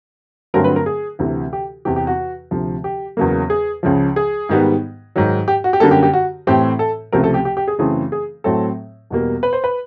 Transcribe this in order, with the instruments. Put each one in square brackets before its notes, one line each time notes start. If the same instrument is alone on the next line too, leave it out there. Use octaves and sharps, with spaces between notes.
[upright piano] G2 D3 F#3 A3 C4 A#4
B4
A#4
G#4
D2 C3 E3
G4
E2 C3 E3 G4
G4
F#4
D2 C3 F3
G4
E2 C#3 F#3 A#3
G#4
C#2 C#3 F3
G#4
G#2 D#3 G3 B3
G#2 D#3 F#3
G4
F#4
G4
F#2 D3 G3 A#3 A4
G4
G4
F#4
A2 E3 A3 C4 G4
A4
C#2 C3 F3 A3 A#4
A4
G4
G4
G4
G#4
F#2 C#3 E3 A3 C4 G#4
G#4
A2 F#3 A3 C4 A4
E2 B2 G3 A#3
B4
C5
B4